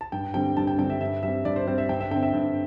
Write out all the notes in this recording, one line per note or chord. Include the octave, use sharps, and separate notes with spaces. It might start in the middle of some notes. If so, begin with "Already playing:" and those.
A5
G2 G5
D3 G3 C4 G5
G2 A5
G5
D3 G3 C4 G5
E5
G2 E5
G3 C4 E5
G2 D5
C5
G3 C4 C5
E5
G2 G5
E5
D3 C4 G5
E5
G2